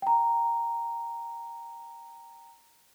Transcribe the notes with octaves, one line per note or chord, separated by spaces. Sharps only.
G5 A#5